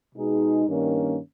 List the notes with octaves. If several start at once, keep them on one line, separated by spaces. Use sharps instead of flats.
B2 G#3 D#4 G#4
G2 D#3 A#3 C#4